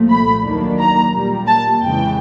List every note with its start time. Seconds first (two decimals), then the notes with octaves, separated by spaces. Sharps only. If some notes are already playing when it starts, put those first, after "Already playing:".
Already playing: C2 A#2 F3 A3
0.09 B5
0.44 D#2 D#3 F#3 A#3 D4
0.79 A#5
1.13 A#2 G3 A#3
1.47 A5
1.82 F2 C#3 E3 G#3 G5